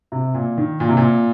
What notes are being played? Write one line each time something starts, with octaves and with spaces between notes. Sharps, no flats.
C3
A#2
D#3
A#2
C3
A#2